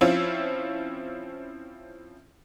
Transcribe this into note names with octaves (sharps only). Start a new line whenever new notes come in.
F3 C4 C#4 E4 F4